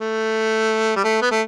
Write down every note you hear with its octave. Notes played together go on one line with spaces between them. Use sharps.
A3
G3
A3
B3
A3